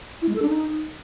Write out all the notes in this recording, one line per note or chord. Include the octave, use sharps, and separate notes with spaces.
E4
G#3
A4
D4
D#4